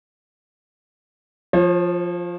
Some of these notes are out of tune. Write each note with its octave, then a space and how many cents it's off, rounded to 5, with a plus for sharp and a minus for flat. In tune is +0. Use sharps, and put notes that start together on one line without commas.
F3 +0 C#5 -45